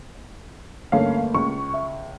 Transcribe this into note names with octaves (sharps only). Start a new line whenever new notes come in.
G1 A3 A#3 C#4 F5
C#2 C#6
E5